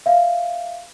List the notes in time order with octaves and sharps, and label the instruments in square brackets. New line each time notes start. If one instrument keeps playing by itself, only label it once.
[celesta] E5 F5